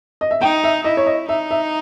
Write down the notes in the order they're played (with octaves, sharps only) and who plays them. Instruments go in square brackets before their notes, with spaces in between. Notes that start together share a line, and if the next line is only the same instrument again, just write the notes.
[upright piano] D#5
E5
[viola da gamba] D#4 [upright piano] G5
[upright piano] E5
[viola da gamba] E4 [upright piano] D#5
[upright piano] C#5
D#5
[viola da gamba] D#4 [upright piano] E5
[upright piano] E5